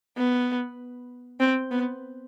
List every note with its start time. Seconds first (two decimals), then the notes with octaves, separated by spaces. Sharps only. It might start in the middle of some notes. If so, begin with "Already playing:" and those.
0.17 B3
1.40 C4
1.71 B3